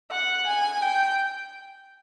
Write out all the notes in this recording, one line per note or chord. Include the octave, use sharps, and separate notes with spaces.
F#5
G#5
G5